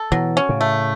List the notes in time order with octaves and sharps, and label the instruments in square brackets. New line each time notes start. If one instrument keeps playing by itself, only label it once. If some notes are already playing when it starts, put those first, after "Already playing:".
Already playing: [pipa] A4
[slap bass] B2 E3 [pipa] F#3
[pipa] C#4
[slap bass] A2 C#3
[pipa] A3